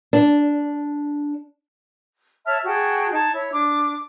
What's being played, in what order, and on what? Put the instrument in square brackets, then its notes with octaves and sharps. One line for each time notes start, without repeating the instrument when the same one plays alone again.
[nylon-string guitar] D4
[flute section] C#5 E5 A5 F6
F#4 G#4 G5 A5
D#4 A5 G#6
E4 C#5
D4 D6